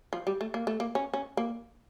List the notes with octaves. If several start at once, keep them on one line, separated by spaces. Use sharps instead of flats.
F3
G3
A3
A#3
A3
A#3
C#4
C#4
A#3